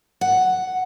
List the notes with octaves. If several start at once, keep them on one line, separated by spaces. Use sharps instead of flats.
F#5